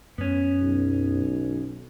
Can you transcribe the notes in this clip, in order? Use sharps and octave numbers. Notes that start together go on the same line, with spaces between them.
F#2 B3 C#4
B1